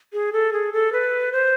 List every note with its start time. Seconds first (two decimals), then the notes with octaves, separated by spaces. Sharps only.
0.13 G#4
0.33 A4
0.53 G#4
0.73 A4
0.93 B4
1.32 C5